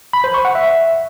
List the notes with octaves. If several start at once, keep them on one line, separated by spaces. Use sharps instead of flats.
B5
C5
C#6
F#5
E5